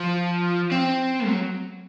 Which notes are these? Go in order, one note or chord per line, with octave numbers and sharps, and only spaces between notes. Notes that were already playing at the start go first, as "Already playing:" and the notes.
Already playing: F3
C4
F#3